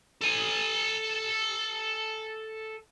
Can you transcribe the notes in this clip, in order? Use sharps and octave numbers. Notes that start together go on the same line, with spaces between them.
A4 G#5